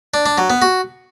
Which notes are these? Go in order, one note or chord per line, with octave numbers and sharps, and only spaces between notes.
D4
D4
F#3
B3
F#4